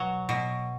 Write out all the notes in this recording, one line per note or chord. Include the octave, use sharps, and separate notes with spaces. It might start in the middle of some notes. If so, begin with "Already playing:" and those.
Already playing: B2 F#3
B2